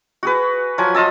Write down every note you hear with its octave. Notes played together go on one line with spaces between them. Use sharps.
F#4 G#4 B4
F3 F#3 F#5 G#5
F4 D#5 A5 E6